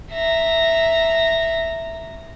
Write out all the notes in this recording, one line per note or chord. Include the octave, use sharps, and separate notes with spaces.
E5 A#5